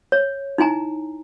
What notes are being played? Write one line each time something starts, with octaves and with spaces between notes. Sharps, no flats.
C#5
D#4 E4 G#5 A#5